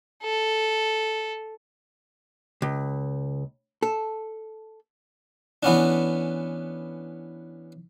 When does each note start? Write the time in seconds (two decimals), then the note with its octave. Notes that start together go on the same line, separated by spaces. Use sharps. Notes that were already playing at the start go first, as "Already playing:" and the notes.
0.23 A4
2.62 C#2
3.82 A4
5.63 E3 B3 C#4 D4